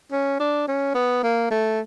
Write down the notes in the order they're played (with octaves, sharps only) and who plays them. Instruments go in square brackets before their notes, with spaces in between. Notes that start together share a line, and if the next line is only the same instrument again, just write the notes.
[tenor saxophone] C#4
D4
C#4
B3
A#3
A3